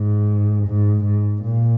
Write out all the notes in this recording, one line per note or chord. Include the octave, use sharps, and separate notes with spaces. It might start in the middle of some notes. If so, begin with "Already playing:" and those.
Already playing: G#2
G#2
G#2
A#2